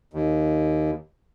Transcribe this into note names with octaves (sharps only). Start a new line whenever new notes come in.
D#2